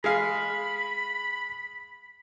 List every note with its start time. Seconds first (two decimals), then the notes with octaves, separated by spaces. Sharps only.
0.04 G#3 F5 B5